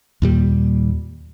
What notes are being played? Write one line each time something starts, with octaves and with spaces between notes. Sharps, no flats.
D#2 A#2 G3